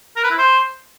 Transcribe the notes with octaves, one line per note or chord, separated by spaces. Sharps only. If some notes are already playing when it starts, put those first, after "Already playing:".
A#4
B4
E4
C5